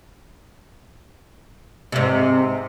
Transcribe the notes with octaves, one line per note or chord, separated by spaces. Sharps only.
G#2 C3